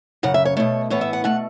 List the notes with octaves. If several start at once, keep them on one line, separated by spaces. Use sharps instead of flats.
F#2 C#3 F#5
E5
C#5
B2 A3 C#5
A2 E3 B3 C#5
E5
F#5
B2 A3 F#5